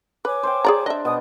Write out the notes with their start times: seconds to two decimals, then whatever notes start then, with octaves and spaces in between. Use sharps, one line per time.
0.25 B4 C#5 G#5 D6
0.43 C5 F5 G5
0.65 G#4 D5 A#5
0.86 D4 D#5 E5
1.05 B2 D#6